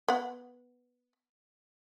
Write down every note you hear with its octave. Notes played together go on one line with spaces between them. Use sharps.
B3 F#5